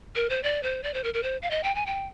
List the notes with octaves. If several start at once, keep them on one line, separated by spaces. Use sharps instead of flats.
A#4
C5
D5
C5
D5
C5
A#4
A#4
C5
F5
D#5
G5
G#5
G5